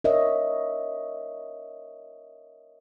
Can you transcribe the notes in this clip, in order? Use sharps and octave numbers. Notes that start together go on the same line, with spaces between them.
A#4 C#5 D#5 E5